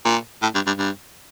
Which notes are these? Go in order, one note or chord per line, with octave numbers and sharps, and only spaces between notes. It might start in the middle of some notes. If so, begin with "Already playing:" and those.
A#2
A2
G2
G2
G2